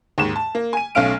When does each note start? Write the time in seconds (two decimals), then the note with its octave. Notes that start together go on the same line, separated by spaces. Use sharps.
0.18 D#2 G#2 E7
0.36 A5
0.55 A#3
0.73 G#5 D#7
0.95 B1 A3 C#4 F5 F6 D7